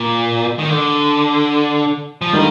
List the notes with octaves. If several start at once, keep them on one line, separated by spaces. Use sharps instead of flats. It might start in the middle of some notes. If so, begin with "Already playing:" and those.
Already playing: A#2
D#3
D3
F3
D3 D#3 G3 A#3 D#4